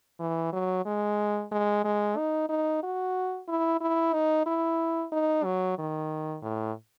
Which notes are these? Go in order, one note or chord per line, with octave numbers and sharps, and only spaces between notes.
E3
F#3
G#3
G#3
G#3
D#4
D#4
F#4
E4
E4
D#4
E4
D#4
F#3
D#3
A2